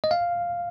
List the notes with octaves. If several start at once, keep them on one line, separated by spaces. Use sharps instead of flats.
D#5
F5